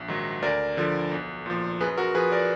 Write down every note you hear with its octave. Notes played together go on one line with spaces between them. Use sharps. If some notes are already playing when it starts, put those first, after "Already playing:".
Already playing: A#1
G#2 D#3 F#3
D2 A#4 D5
D3 F3
B1
A#2 F3
F#2 G#4 B4
F#4 A#4
F3 G#4 B4
A#4 D5